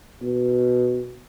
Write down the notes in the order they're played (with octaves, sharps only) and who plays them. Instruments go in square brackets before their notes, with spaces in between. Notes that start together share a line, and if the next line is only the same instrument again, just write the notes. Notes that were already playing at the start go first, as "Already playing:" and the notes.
[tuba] B2